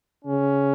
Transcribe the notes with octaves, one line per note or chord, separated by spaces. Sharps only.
C#3 C#4